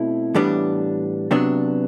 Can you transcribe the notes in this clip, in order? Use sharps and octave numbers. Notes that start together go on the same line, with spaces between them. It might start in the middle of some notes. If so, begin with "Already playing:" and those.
Already playing: B2 A3 C4 E4
A2 E3 G3 B3 D4
C3 F#3 B3 D4